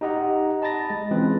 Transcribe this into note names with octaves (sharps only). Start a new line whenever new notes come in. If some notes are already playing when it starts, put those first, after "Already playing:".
D#4 G4 D#5 F#5 A#5
D#5 A5 B5 A6 A#6
G#3
E3 G#3 C4 C#4 F4 B4